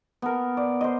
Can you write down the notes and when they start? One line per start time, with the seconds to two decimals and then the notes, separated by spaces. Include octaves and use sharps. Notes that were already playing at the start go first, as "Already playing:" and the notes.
0.22 B3 A#4
0.57 D5
0.81 C5 D#5